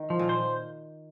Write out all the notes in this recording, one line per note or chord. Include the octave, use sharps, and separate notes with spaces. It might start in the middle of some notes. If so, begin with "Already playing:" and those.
Already playing: D#3
F3
A#2
C5